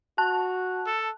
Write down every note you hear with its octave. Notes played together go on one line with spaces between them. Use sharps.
F#4 A5 F#6
A4